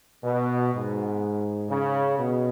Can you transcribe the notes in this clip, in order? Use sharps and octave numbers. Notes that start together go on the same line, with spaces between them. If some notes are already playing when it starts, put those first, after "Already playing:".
B2
G#2
C#3
B2